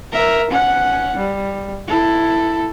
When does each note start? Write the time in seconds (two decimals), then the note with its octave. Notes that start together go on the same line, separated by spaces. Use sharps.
0.13 A#4 E5
0.51 C#4 F#5
1.17 G3
1.88 E4 A4